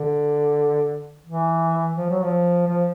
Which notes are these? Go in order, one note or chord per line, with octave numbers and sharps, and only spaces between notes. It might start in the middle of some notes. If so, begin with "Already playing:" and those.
Already playing: D3
E3
F3
F#3
F3
F3